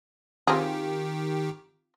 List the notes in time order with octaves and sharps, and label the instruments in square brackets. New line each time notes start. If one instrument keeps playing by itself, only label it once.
[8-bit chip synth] D#3 G4 [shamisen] C4 F4 G#4